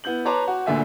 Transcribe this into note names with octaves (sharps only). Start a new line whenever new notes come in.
B3 E4 G6 F#7
B4 C#5 A5 A#5 C6 D6
F#4
D2 A#2 D3 E5 G#5